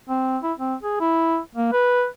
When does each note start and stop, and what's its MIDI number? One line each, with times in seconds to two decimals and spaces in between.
0.09 0.38 60
0.43 0.53 64
0.58 0.75 60
0.83 0.96 68
1.00 1.39 64
1.55 1.72 58
1.72 2.06 71